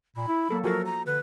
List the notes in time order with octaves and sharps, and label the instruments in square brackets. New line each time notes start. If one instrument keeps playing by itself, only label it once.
[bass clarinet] A#2 [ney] B5
[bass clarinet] E4
[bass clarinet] F#3 [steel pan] A#3 A4
[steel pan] F3 F#4 A4 [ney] A#4
[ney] A#5
[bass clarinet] D3 [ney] B4